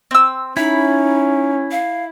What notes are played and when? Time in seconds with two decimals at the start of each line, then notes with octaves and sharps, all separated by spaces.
0.11 C4 E6
0.57 C#4 D#4 E4 B5
1.71 F5